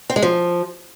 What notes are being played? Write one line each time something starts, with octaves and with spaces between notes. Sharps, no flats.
C4
G#3
F3